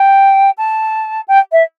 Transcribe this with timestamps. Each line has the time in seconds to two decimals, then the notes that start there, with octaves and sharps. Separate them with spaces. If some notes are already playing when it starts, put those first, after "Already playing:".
Already playing: G5
0.57 A5
1.28 G5
1.52 E5